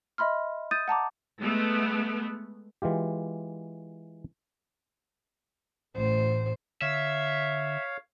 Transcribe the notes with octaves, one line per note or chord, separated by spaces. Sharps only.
D#5 E5 B5 C6 F6
D#6 G6 A6 D#7
F#5 A5 A#5 D6
G#3 A3 B3
E3 G#3 F4 G4
A1 C5
D3 C#5 E5 F5